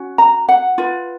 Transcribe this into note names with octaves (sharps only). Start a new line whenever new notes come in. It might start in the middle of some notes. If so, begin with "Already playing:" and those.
Already playing: C#4 F#4
A#5
F#5
F4 B4